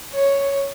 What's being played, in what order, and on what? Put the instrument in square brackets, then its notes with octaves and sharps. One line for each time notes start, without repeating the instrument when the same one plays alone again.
[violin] C#5